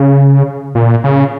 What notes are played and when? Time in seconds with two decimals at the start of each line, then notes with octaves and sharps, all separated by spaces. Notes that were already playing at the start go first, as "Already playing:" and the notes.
Already playing: C#3
0.75 A#2
1.04 C#3